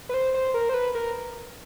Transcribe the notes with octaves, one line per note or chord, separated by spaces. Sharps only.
B4
C5
C5
A#4
C5
B4
A#4